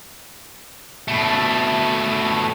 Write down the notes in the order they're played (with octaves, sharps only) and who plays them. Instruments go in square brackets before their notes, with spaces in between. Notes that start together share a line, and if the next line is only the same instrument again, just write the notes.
[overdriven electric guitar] B2 A3